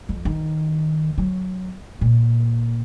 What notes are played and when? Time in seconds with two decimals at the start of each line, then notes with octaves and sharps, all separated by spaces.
0.09 F2
0.25 D#3
1.18 F#3
2.01 A#2